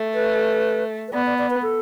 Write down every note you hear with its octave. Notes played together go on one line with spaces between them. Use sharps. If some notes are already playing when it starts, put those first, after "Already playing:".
Already playing: A3
B4
B4
B3 D5
D5
D5
B4
A4